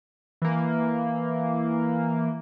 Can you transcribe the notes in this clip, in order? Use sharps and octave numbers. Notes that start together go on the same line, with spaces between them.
E3 A#3